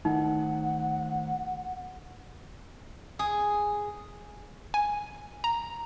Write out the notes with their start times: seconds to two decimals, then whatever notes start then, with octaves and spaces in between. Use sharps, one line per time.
0.05 D#3 A3 D#4 F#5
3.19 G#4
4.74 G#5
5.44 A#5